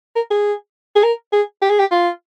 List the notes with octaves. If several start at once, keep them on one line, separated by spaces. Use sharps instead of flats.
A#4
G#4
G#4
A#4
G#4
G4
G#4
G4
F4